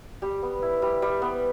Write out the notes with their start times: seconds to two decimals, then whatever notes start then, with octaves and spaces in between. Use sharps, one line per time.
0.22 G3 G4
0.42 B3
0.62 E4
0.82 G3
1.02 G3
1.22 B3